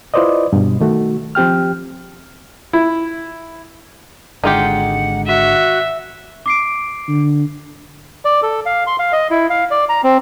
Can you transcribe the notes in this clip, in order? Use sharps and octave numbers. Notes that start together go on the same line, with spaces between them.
E4 F4 B4 C5 D5 D#5
G2 B2
D#3 A3 F#4
F3 C4 G4 G5 F6
E4
G#1 D3 G#3 D#4 F4 G4 F#5
F#4 E5
D6 C7 D7
D3
D5
A4
F5
C6
F5
D#5
E4
F5
D5
A#5
C4